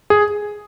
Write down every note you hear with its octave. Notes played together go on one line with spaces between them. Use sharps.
G#4